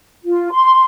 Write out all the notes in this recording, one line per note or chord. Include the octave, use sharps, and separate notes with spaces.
F4
C6